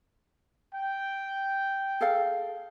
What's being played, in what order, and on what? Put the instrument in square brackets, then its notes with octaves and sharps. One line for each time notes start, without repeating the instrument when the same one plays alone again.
[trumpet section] G5
[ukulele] G#4 A4 F5